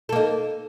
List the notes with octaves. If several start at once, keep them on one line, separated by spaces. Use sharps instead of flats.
A#3 D#4 A4